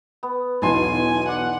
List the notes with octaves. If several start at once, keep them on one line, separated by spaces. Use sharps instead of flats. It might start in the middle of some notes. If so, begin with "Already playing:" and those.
B3
B1 E2 B2 G#5 A5 C6
D5 F#5